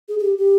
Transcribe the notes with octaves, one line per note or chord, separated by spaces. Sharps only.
G#4
G#4
G4
G4